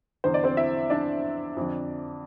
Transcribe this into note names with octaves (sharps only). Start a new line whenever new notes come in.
E2 D3 C5
D5
C4 C5
E4 E5
D4 D5
F2 D3